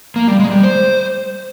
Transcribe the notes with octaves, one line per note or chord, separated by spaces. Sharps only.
A#3
G3
G#3
G3
C5